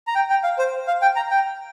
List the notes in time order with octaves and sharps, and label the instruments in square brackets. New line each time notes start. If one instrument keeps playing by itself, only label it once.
[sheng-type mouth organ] A#5
G5
G5
F5
C5
F5
G5
A#5
G5